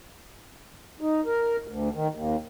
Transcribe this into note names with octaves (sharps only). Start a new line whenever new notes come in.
D#4
A#4
D2
D#3
D#2